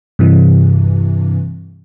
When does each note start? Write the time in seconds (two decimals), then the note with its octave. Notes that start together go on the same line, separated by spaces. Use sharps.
0.19 G2 C3 E3